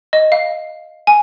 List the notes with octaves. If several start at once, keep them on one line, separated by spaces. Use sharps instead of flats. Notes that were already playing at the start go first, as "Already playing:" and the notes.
D#5
F5
G#5